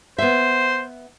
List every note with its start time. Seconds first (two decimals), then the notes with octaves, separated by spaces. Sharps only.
0.18 B3 C5 E5